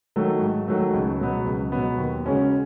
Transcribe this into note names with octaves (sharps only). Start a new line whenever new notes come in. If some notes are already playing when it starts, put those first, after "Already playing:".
D#3 F#3 A3
G#2
D#3 F#3 A3
C#2
B2 F#3 B3
C#2
B2 F#3 B3
D#2
C#3 G#3 C#4 F#4